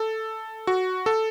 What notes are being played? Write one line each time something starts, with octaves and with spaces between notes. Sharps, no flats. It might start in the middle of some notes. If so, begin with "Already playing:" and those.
Already playing: A4
F#4
A4